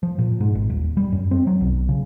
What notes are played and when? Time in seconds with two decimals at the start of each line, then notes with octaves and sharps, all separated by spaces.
0.03 F3
0.19 A#2
0.40 G#2
0.55 G#1
0.70 D#1
0.97 G3
1.12 F#2
1.31 C4
1.47 F#3
1.61 B1
1.89 C#3